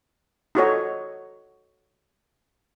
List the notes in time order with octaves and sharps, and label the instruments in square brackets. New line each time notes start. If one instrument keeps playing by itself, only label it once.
[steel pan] D#4 F4 F#4 A4 C#5 D#5